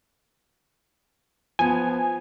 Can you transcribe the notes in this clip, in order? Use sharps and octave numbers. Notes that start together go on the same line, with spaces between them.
F3 B3 G#5